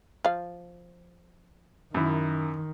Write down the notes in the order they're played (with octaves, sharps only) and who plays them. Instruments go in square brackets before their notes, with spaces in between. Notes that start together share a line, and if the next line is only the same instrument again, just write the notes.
[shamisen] F3 F5
[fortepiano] F#2 E4 [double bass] D#3